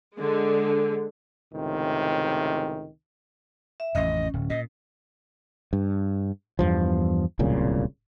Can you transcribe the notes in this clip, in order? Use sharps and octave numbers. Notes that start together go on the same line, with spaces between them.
D3 G#3
C#2 A2 C3 D#3
E5
A1 F2 C#4 D#5
D1
A#2 D#5
G2
E2 G2 F3
D1 C2 A#2 C#3